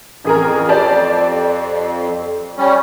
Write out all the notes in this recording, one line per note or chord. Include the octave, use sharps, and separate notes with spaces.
A1 F2 G#4 A#4
G4 D5 A5
G3 C#4